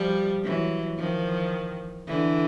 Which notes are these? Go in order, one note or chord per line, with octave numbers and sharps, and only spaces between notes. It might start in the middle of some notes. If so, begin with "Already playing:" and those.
Already playing: F3 G3
E3 F#3
D#3 F3
D3 E3